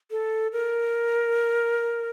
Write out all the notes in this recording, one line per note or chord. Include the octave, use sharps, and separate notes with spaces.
A4
A#4